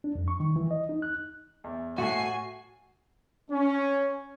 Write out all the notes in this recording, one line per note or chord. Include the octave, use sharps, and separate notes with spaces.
D4
F2
C#6
D#3
E3
D#5
D#4
F#6
E2
A2 F#4 G#5 C7
C#4